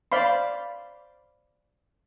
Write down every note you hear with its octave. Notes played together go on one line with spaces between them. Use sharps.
C5 D5 F5 B5 C6